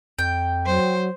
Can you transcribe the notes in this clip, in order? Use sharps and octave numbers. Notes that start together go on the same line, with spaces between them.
F2 G5
F#3 C5